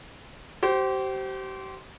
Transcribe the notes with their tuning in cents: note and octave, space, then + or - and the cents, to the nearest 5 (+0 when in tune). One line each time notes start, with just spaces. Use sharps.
G4 -35 C5 +0